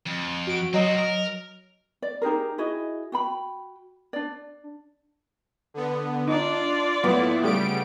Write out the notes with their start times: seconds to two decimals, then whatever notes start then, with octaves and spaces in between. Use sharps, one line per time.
0.07 F2
0.47 F#4 D7
0.73 F#3 C4 F#4 D#5
0.97 A#4
2.02 D5
2.22 D#4 G4 G#4 A#4
2.58 E4 F#4 G#4 D#5
3.12 F#4 G5 B5
4.13 D4 D5
5.74 D3 B3
6.28 D4 D#4 F4 D5
7.04 A2 F#3 A#3 B3 E4
7.43 C#3 G3 A3 G4 D7